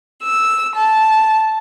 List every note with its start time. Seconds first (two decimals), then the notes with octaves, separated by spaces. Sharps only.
0.22 E6
0.74 A5